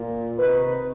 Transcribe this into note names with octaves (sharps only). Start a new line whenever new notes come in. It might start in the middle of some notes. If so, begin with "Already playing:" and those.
Already playing: A#2
C3 D#3 B4